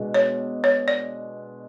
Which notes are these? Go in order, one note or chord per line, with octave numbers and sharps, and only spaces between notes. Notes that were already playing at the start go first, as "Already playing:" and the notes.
Already playing: B2 G#3 D4
C#5
C#5
D5